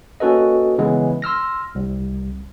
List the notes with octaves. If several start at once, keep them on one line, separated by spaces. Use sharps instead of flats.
A#3 C#4 F#4 A4 B4 D#5
C#3 E3 G#3 B3
C6 E6 F6 A#6
C2